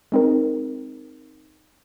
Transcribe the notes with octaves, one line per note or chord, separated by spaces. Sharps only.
G#3 C4 D#4 A#4